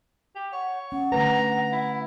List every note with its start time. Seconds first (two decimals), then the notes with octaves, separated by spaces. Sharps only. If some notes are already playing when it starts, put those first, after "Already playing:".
0.36 G4
0.53 C#5 F#5
0.92 C#4 F#5
1.12 D3 A3 B4 A#5
1.73 E4